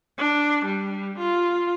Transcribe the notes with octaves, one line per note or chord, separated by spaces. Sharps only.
D4
G3
F4